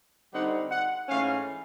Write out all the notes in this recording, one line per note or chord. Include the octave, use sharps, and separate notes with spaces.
D3 G3 C4 D#4 F#5
F#5
G#2 E3 A3 C#4 F5